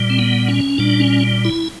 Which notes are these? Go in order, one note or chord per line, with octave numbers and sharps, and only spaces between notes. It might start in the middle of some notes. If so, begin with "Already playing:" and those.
Already playing: A#2 G3
C4
B3
C#4
A#2 G3 D4
C#4
E4